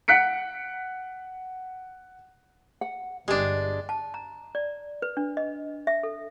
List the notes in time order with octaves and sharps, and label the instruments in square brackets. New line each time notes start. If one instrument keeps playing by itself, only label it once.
[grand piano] F#5 F#6 B6 C#7 D7
[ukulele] F#5
[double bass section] G1 [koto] G#3 D4 [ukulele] G4
[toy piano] A5
A#5
D5
B4
D4
D#5
E5
A4